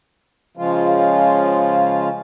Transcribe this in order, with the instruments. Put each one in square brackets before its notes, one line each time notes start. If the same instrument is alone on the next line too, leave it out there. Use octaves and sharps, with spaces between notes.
[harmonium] C#3 F3 G#3 F4